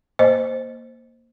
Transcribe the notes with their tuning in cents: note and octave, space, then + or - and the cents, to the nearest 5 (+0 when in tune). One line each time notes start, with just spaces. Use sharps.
A#3 +0 C5 +0 D#5 +0